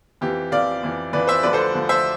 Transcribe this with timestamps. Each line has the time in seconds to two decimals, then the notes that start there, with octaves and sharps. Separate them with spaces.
0.21 F2 E3 G4
0.52 F2 E3 D5 F5
0.83 F2 E3
1.13 F2 E3 B4 D5
1.27 C5 E5
1.43 D2 D3 F3 B4 D5
1.53 A4 C5
1.73 D2 D3 F3
1.89 C5 E5